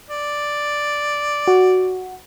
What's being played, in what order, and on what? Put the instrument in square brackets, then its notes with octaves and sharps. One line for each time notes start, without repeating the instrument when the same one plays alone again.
[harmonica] D5
[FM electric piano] F#4